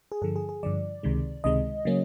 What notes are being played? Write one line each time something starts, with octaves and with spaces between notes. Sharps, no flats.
G#4
G2 D3 F3 A4
G#4
G#4
G2 D3 F3 D5
C#2 C3 D#3 G#3
C#2 C3 D#3 G#3 D#5
C#3 F#3 A#3 C#4